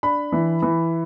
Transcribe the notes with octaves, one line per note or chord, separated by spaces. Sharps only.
D4 B5
E3
E3